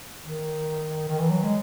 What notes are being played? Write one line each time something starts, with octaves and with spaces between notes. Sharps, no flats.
D#3
D#3
E3
F#3
G#3